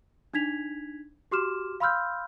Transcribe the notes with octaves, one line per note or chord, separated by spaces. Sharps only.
D4 D#4 G#6 B6 F7
F#4 G4 C6 D6 F6 E7
F5 B5 C6 E6 F6 G6